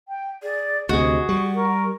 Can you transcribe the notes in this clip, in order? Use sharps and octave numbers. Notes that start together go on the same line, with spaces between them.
G5
G#4 D5
D2 C3 F#4 G#4 D#5
G3 C#6
A#4